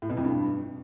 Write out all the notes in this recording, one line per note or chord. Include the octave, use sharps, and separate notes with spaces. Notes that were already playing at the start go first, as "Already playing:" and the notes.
A2
B2
F2
G2